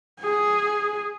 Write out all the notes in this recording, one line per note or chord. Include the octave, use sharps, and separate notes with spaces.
G#4